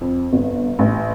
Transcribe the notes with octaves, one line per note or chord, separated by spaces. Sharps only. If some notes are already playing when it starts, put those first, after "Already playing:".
F2
G1
A1